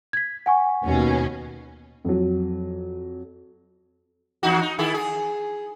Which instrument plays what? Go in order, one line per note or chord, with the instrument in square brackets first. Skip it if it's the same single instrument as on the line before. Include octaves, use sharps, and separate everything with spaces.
[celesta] G#6 B6
F#5 G#5 C#6
[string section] D#2 B2 C#4
[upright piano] F2 F#3
[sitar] E2 D#4 F#4
D#4
D#3 E4 G#4
G#4